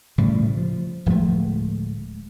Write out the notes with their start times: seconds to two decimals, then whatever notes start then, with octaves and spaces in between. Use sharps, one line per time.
0.18 A2 C#3 F3 G3
0.57 F3
1.06 D1 F3 G#3 A3